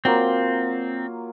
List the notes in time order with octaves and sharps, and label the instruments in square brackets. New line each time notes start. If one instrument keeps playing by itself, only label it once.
[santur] F#3 A#3 F4 [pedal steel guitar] C4